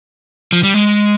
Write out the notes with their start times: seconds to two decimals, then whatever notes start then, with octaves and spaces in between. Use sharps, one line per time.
0.52 F3
0.63 G3
0.74 G#3